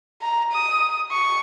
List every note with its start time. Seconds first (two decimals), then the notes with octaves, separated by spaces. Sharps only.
0.22 A#5
0.53 D#6
1.12 C#6